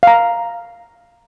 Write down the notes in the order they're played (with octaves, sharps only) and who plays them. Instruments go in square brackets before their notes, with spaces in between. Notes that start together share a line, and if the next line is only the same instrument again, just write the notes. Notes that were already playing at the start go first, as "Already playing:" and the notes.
[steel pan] F5 A#5